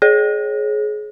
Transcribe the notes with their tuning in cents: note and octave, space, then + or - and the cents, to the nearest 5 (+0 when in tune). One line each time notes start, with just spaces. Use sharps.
G#4 +25 C#5 -30